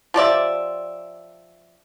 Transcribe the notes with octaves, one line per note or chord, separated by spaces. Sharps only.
F3 G4 D5 E5